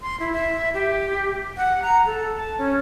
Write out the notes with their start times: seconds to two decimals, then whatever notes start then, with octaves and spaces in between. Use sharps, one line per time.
0.01 C6
0.20 E4
0.33 E5
0.74 G4
1.57 F#5
1.82 A#5
2.06 A4
2.37 A5
2.58 C#4